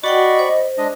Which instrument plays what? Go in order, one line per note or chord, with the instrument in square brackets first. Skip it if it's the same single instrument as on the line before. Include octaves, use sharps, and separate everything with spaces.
[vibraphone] F#4 F#5 G5 [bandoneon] D5 B5 C#6 [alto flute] D#5
[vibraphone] C5
[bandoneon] G#3 D4 D#5